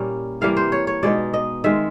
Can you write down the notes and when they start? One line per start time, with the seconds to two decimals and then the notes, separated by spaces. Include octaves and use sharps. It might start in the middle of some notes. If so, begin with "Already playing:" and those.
Already playing: A#2 G3 A#3 C#4 E4
0.41 C3 E3 G3 A#3 F5
0.57 C5
0.72 C#5
0.87 C#5
1.03 B2 G#3 B3 D#4 D5
1.34 D#5
1.64 D#3 G#3 C4 E5